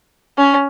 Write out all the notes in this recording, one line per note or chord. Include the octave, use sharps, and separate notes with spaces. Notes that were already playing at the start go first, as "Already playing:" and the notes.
C#4